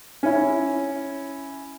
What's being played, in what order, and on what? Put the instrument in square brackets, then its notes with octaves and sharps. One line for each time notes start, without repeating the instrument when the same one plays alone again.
[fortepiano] C#4 E4